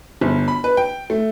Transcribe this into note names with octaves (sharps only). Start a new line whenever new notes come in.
G1
B5
B4
G5
A3